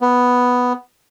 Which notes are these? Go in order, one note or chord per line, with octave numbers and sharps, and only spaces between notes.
B3